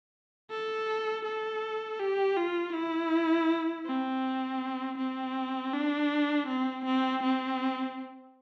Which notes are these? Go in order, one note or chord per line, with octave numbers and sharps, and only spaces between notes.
A4
A4
G4
F4
E4
C4
C4
D4
C4
C4
C4